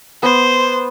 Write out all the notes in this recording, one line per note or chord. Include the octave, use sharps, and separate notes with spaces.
B3 C5